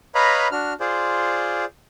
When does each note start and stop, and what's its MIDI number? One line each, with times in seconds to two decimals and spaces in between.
0.15 0.48 71
0.15 0.48 73
0.15 0.48 75
0.15 0.48 77
0.15 0.48 82
0.15 0.48 83
0.52 0.73 62
0.52 0.73 66
0.52 0.73 89
0.80 1.65 65
0.80 1.65 68
0.80 1.65 72
0.80 1.65 74